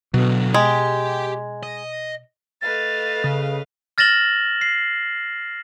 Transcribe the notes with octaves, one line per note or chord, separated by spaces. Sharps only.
B2 D3 F#3
G#3 G4 G5
D#5
A3 B4 D#5 F5 A6
C#3
F6 A6 A#6 E7 F#7 G7
C7